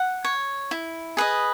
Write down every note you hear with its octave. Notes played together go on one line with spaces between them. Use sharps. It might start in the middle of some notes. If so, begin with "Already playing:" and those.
Already playing: F#5
C#5
E4
G#4 B4 D#5